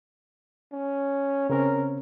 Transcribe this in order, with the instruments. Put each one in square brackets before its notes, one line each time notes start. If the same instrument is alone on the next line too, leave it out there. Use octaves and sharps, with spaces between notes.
[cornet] C#4
[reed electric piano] C#3 C4 C#4 [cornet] A#4